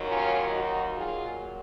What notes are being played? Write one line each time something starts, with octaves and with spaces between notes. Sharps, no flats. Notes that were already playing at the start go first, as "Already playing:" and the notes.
Already playing: D#2 D#3 F#3
C#4 F4
D#4 F#4
A#2 F#3 F4 G#4